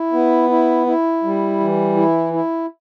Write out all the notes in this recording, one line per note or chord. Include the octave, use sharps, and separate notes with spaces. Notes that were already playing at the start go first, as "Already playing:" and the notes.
Already playing: E4
B3
E4
E4
G3
E3
E4
E4